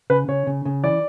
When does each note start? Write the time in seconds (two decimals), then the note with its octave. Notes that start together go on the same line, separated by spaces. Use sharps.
0.10 C#3 B4
0.28 C#3 C#5
0.47 C#3
0.65 C#3
0.83 E3 D5